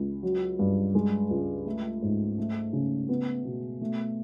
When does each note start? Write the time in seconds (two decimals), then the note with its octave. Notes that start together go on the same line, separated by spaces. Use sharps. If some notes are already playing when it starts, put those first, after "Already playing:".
Already playing: C#2
0.23 F#3
0.59 G2
0.95 G#3
1.30 C#2
1.66 A3
2.02 G#2
2.38 A3
2.73 C#3
3.09 B3
3.44 B2
3.81 A3